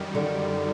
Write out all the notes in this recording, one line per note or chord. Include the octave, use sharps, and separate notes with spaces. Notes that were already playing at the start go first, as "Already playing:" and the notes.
Already playing: F#2 D#3 G3
D3